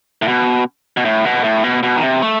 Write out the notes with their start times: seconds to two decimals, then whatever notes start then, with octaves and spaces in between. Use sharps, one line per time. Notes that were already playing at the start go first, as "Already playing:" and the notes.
0.22 A2
0.28 B2
0.97 B2
1.05 A2
1.25 B2
1.44 A2
1.64 B2
1.83 B2
1.96 D#3
2.02 C3
2.22 A3